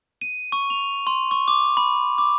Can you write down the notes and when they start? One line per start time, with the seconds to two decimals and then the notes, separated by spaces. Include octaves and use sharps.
0.21 D#7
0.52 C#6
0.70 F7
1.07 C6
1.31 C#6
1.48 D6
1.77 B5
2.18 D6